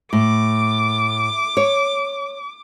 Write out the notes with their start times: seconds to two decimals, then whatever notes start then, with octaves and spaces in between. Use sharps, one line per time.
0.13 A2 D6
1.57 C#5